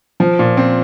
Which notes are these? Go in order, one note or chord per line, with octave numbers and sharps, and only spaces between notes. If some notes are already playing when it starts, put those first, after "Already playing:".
F3
A#2
C4